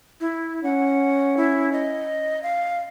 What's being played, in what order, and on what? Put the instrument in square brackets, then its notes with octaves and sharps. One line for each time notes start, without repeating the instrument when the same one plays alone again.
[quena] E4
[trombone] C#4 [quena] F#5
[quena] E4
D#5
F5